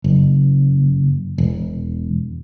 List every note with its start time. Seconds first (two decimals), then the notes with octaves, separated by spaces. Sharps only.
0.04 F#1
1.38 E1